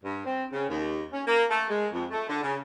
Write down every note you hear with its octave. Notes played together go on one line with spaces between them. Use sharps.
G2
C4
C#3
D#2
C#4
A#3
A3
G#3
F2
A3
D3
C#3